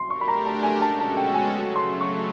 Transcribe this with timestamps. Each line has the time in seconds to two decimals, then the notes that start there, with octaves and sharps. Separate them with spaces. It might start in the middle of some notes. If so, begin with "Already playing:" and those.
Already playing: C6
0.10 A3 D4 G4 A#4 C#6
0.21 B5
0.28 A#5
0.46 A5
0.63 G#5
0.81 B2 G#3 C#4 F#4 A4 A5
0.99 A5
1.17 G5
1.34 G#5
1.52 C#3 F#3 A3
1.76 C6
2.01 C#6